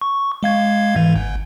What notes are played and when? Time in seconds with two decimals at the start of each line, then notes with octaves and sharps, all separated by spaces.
0.01 C#6
0.43 G#3 F5 G#6
0.96 G#2 E3
1.16 G1